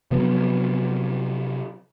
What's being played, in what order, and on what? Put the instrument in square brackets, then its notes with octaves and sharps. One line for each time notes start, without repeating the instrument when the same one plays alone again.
[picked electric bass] C3 F3 F#3 B3